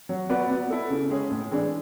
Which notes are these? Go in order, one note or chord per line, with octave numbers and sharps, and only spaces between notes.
F#3
B3 F#4 B4 D5
B3
E4 A4
C#3
G#3 C#4 G#4
A2
E3 G#3 D4